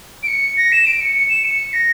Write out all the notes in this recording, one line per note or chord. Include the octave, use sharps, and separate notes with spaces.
D7
C#7
A#6
E7
D7
C#7
C#7
E7
C#7
A#6